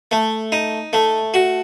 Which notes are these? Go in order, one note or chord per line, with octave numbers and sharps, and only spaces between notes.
A3
D#4
A3
F#4